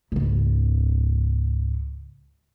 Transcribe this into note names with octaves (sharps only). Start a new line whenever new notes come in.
C#2 G#2